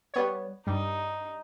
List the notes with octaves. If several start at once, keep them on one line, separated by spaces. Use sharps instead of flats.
G3 B3 C#5
G2 G3 D#4